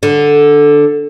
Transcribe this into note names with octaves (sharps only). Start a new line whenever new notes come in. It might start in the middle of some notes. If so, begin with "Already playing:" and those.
D3